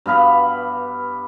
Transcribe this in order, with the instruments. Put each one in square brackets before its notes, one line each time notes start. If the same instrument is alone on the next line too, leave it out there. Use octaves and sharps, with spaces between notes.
[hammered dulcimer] G2 B3 F5 B5